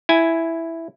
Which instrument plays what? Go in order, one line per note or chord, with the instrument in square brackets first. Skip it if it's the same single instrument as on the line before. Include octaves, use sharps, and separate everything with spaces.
[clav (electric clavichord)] E4 G#5